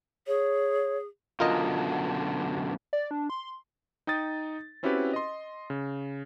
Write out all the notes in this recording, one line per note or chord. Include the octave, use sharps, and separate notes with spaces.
G#4 C#5
F#2 B2 D3 F4 A#4 D#5
D5
D4
C6
D#4 G5 D#6 A6
C4 C#4 E4 F#4 G4 B4
D#5 C6
C#3